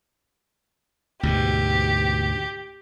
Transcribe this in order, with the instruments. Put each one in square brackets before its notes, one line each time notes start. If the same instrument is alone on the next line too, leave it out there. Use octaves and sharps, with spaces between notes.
[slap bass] D2 G#2 B2 [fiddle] G4